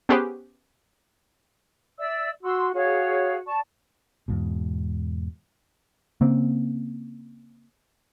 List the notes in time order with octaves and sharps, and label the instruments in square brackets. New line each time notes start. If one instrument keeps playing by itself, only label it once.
[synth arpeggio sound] B3 C#4 G4 G#4 B4 C5
[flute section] D5 E5 E6
[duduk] F#4 [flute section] C6 E6
[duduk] F#4 [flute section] G#4 C#5 F5
[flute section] D5 A5 C#6
[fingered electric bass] E2 G#2 B2
[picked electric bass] C#3 A#3 C4